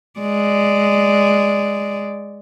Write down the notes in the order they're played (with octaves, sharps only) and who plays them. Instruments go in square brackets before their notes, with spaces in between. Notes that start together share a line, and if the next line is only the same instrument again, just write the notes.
[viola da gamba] G#3 D5